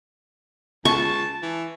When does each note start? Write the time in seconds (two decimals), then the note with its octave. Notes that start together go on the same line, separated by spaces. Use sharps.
0.85 C#2 A5 C#6
1.42 E3